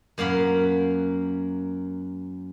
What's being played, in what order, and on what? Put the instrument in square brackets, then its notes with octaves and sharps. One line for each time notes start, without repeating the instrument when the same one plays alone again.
[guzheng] F#2 A#3 F5 F#5 B5